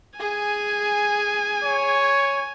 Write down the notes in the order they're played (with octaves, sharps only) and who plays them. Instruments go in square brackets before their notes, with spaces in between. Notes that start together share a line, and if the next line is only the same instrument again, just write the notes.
[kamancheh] G#4 [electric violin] G#5
[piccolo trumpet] C#5